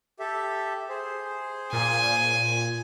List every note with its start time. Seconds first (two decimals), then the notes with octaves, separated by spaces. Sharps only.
0.19 G4 A4 E5
0.89 G#4 C5
1.72 A#2 G#5